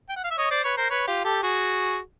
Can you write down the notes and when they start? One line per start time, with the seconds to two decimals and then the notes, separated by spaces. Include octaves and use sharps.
0.09 G5
0.16 F#5
0.24 F5
0.31 E5
0.38 C#5 D#5
0.50 C5 D5
0.64 B4 C#5
0.77 A#4 C5
0.90 B4 C#5
1.07 F4 G4
1.25 G4 A4
1.43 F#4 G#4